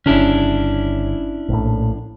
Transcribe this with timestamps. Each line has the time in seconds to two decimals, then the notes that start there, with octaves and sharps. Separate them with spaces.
0.06 G1 C#3 C#4 D4 E4
1.49 A#1 A2